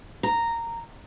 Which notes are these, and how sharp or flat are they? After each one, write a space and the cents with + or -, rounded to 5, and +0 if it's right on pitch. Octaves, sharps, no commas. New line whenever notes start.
A#5 -10